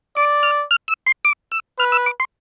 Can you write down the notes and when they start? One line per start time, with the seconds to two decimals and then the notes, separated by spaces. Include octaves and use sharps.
0.17 D5 D6
0.43 F6
0.71 F6
0.88 E6
1.06 C6
1.25 D6
1.51 E6
1.79 B4 F6
1.92 E6
2.06 D6
2.20 C6